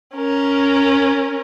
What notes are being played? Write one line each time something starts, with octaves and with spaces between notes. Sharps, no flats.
C#4 A#4